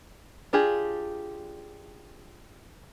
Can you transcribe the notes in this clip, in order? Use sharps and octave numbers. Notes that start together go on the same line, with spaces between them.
D4 F4 G4 G#4